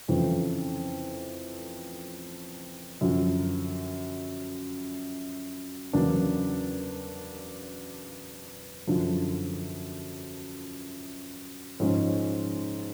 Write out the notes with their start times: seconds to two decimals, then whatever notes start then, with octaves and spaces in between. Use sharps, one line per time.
0.08 F2 C#3 E3 A3
3.01 F#2 D3 F3
5.93 E2 C#3 F#3 A#3 D4
8.87 F#2 D3 F3
11.80 G#2 F3 G#3 C#4